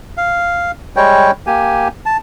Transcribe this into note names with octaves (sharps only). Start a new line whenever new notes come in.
F5
G3 G#3 C#5 G5
A#3 G4 G#5
A5